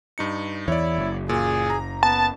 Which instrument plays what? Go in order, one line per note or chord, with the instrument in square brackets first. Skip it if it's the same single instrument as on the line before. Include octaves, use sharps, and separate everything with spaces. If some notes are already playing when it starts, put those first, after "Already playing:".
[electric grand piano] G2 D#4 C#7
[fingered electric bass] E2 E3 [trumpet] E4 [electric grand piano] C#5 D5
[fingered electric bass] F#1
[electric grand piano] A#2 [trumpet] G#4
[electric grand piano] A#5
[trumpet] B3 [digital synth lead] A5